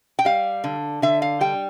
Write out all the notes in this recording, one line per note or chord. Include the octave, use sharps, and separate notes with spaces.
G5
G3 F5
D3
D3 E5
F5
G3 G5